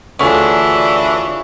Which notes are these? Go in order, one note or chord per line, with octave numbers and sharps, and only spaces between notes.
D2 E3 D4 F4 F#4 G#4 C#5 D5